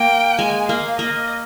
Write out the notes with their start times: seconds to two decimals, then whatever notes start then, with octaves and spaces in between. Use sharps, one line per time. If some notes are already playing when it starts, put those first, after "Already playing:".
Already playing: A#3 G5
0.39 G#3 G#5
0.68 A#3 F5
0.98 A#3 D#5